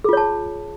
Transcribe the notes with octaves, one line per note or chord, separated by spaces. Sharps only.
F4 G#4 C#5 A5